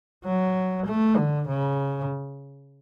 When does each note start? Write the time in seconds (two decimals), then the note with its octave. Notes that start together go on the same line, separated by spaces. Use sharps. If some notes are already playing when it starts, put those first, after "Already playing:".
0.25 F#3
0.86 A3
1.17 D3
1.48 C#3